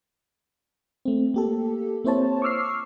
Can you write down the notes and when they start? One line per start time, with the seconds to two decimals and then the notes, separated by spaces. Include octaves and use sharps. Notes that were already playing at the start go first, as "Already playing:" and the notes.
1.05 A3 C4
1.34 A#3 G4 A4
2.04 A#3 C4 E4 C5 C#5 A5
2.42 C#6 D6 E6 F6 C7